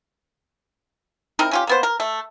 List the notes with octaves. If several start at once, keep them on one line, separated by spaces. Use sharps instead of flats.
C4 D#4 E4 A#4
C#4 F4 G4
A#3 B3 C5
A#4
A3